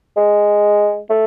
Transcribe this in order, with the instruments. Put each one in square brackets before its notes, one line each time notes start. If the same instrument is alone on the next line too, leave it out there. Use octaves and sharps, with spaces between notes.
[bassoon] G#3
A3